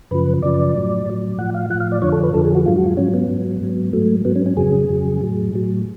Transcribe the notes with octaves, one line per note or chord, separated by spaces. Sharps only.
F#2 C#3 F3 B4
F#2 C#3 F3 D5
A2 F#3
A2 F#3
A2 F3 F#5
F5
A2 F3 F#5
F5
D5
F2 D3 F3 C#5
A4
B4
F2 D3 F3 A4
G#4
F#4
G#2 F#3 F4
F#4
F4
G#2 F#3 C#4
B3
G#2 F#3
G#2 F#3
G#2 F#3 A3
G#2 F#3 B3
C#4
C#4
F2 C#3 F#3 G#4
F2 C#3 F#3
A2 F#3
A2 F#3